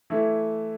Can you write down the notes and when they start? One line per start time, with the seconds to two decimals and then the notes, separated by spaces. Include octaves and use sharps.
0.10 E3 A3 E4